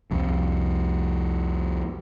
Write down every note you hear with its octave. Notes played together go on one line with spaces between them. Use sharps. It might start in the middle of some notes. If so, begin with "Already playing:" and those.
C2 F2